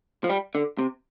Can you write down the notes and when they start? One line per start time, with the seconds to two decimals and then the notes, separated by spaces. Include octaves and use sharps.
0.24 F3
0.30 G3
0.55 D3
0.79 C3